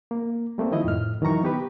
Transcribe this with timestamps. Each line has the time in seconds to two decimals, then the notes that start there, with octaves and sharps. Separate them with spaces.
0.11 A#3
0.58 G3 A3 A#3 C4
0.72 D#3 F3 E4 D#5
0.84 F2 A2 F6
1.22 D#3 E3 F#3 A#5 C#6
1.43 B3 G4 B4